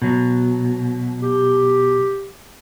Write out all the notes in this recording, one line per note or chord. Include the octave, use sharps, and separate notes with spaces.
B2 F#3
G4